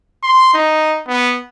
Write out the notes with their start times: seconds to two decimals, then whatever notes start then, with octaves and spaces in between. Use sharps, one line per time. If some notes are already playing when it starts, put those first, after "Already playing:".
0.23 C6
0.54 D#4
1.08 B3